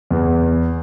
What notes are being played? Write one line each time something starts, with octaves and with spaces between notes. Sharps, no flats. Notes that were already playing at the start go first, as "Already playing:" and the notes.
E2